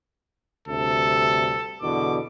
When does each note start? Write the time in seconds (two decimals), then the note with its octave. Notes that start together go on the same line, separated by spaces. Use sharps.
0.68 D2 G2 C3 A4
1.82 E2 B2 D3 D6